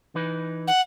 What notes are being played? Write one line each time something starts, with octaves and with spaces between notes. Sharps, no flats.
E3 D#4 B4
F#5